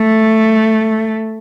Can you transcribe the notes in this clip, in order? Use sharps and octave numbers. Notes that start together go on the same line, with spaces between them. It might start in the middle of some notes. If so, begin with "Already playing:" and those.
Already playing: A3